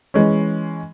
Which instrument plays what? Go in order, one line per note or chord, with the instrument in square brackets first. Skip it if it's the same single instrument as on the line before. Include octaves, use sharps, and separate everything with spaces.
[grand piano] E3 G#3 C#4